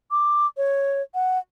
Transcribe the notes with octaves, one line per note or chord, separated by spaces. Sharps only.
D6
C#5
F#5